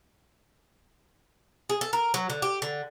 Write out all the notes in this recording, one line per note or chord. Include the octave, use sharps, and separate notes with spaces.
G#4
A4
A#4
F#3
D3
G4
D3